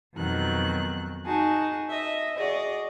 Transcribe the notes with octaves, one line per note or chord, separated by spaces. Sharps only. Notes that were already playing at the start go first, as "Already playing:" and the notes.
F2 B2 D#3 F#3 F#6
D#4 F#4 G#4 A5
D#5 E5
F#4 G#4 D5 D#5